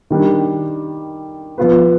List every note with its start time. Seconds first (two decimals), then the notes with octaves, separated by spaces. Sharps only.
0.10 D#3 G3 D4
1.58 F3 B3 F4 B4